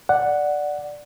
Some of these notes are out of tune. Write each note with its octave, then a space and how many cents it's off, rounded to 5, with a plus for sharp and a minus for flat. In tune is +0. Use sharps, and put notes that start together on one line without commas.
D5 +0 F#5 +0